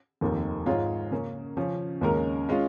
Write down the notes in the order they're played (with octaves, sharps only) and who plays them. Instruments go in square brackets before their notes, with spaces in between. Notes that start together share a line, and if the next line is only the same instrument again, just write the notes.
[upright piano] F1 D#2 D#3
G#2 G#3 F4 C#5
C#3 A#3 C#4
C#3 F3 C#4
D#2 C#3 G#3 C#4 A#4
G#3 C#4 F4